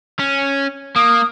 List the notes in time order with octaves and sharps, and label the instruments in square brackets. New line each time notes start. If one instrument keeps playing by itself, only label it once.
[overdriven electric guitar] C#4
[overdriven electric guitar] A#3 [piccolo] D#6